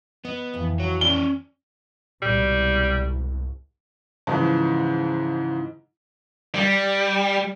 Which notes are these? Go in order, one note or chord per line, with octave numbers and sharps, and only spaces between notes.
B3 D#5
F2 A2 E3
F#4 C#5
C#4 D5 G7
C2 G#2 B2 G3
G#2 C#3 E3 F3
G3